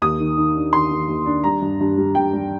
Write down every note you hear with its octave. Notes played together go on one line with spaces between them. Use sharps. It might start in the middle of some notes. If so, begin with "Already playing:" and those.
D#2 D#6
D#3
D#3
D4
D#3 C6
D#3
D#2
D4
G3 A#5
G2
G2
G3
G2 G5
G3